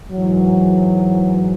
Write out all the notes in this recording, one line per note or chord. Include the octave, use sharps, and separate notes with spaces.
G#2 E3 F#3